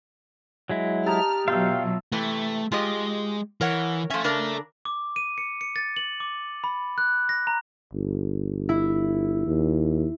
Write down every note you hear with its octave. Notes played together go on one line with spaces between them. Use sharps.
F#3 G#3 E4
D#4 G4 A5 F6
B2 F#3 F4 E5 F5 G5
C3 E3 A3
G#3 F4 G4 D#5
E3 A#4 C#5 F#5
F3 C#4 A4 E5
C#3 D4 A#4
D6
D#7
C#7
C#7
A6
F#7
D6
B5
F#6
A#6
A#5
G1
E4
D#2